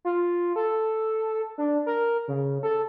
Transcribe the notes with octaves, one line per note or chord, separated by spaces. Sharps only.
F4
A4
D4
A#4
C#3
A4